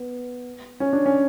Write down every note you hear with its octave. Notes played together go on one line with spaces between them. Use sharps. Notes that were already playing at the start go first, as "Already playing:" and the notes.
Already playing: B3
C#4
D4
C#4